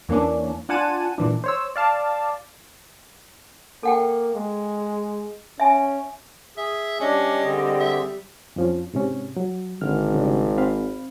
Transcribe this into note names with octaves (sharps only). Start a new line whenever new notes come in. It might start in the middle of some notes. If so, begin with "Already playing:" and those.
E2 E3 A#3 C#4 D4
D4 F4 F#5 G#5 A5 D#7
A#2 E3 D4
C5 C#5 E6
D5 F5 A5
A#3 A4 F#5 G5
G#3
C#4 E5 G#5
G#4 E5
G3 C#4 D4 D#5
D3 C4 G#4
E5
F2 F3 C#4
G#2 C3 C#4
F#3
G#1 D3 F6
C#3 G3 D4
C4 F5 B5